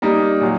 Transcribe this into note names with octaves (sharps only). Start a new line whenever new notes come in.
G3 A#3 D#4
A#2 F#3